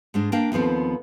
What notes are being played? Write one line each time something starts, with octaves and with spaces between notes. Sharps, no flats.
G#2 G#3 D4
A#3 D4 F5 G5
D#2 F3 B3 C4 A4